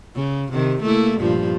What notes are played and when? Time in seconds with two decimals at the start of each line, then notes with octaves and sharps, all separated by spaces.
0.15 C#3
0.52 C3 D#3
0.82 A3 A#3 E4
1.19 G2 A#2 F3